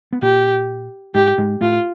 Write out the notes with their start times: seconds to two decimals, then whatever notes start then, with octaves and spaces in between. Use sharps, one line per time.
0.13 B3
0.22 A#2 A#3 G4
1.14 G#2 G#3 G4
1.38 G#2 G#3
1.61 A2 A3 F4